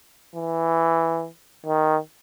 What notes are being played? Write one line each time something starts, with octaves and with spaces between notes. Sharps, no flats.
E3
D#3